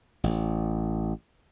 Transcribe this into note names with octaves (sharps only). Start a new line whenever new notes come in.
A1